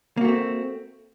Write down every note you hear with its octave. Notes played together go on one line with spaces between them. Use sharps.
A3 A#3 C4 F#4